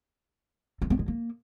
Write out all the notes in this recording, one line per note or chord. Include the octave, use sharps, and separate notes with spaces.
A3
B3
G#3
A#3